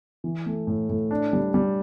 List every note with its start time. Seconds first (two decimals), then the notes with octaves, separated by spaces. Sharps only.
0.24 E3
0.46 A3
0.67 A2
0.89 A2
1.11 D4
1.33 G3
1.54 G3